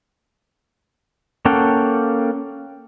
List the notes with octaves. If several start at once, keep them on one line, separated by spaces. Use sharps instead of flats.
A#3 C#4 A4 F#5 G5